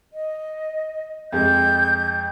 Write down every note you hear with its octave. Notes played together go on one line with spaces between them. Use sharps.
D#5
F2 G#3 G6